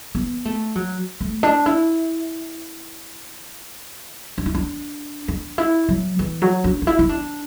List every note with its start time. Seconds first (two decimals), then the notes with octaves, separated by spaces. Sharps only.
0.15 B3
0.45 A3
0.76 F#3
1.21 A3
1.43 D4
1.66 E4
4.38 D4
4.46 E4
4.55 D4
5.28 D4
5.58 E4
5.89 F#3
6.19 E3
6.42 F#3
6.64 D4
6.82 D4
6.87 E4
6.99 E4
7.09 D4